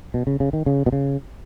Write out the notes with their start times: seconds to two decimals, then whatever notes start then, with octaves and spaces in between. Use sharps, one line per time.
0.14 B2
0.27 C#3
0.40 C#3
0.53 D#3
0.66 C#3
0.86 B2
0.92 C#3